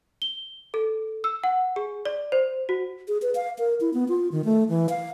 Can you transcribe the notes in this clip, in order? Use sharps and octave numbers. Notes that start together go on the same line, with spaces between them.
G7
A4
E6
F#5
G#4
D5
C5
F#4
G#4
B4
F5
A#4
E4
B3
F4
D#3
A3
E3
F5